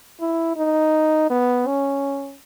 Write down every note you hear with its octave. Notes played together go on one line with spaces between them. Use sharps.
E4
D#4
B3
C#4